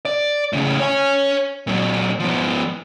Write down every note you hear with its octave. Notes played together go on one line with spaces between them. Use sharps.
D5
A2 C#3
C#5 G#5
A#2 F#3
F3 B3